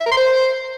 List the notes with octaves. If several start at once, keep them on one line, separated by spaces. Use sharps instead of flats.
E5
A#4
C6
C5